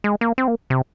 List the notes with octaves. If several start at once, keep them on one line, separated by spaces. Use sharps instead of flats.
G#3
A#3
C4
A#3
C3